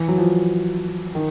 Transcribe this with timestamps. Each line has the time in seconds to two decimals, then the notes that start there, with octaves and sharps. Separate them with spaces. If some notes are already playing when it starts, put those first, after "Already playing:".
Already playing: E3
0.08 F#3
0.18 F3
1.15 D#3